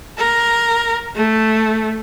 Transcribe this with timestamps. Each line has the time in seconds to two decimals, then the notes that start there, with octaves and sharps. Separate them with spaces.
0.18 A#4
1.16 A3